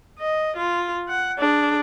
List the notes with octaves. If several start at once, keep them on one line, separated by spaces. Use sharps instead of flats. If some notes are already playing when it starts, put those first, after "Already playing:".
D#5
F4
F#5
D4 G#4